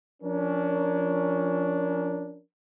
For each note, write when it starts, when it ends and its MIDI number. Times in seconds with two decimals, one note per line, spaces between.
0.22 2.39 53
0.22 2.39 61
0.22 2.39 62
0.22 2.39 70